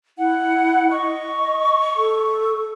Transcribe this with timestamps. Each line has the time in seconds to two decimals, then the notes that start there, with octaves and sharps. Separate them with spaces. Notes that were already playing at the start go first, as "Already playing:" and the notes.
0.18 E4 F#5
0.91 D#5 C#6
1.96 A4